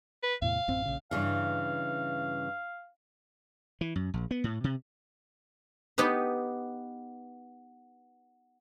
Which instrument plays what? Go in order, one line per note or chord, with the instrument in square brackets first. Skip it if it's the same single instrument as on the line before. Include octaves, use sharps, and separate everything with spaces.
[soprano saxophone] B4
[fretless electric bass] E2 A2 C3 [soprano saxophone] F5
[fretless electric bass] A1 F#2 C4
A#1 C#3
[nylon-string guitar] G2 C#3 E3 [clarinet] F5
[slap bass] E3
F#2
A#1
B3
A2
C3
[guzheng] B3 D#4 G4 B4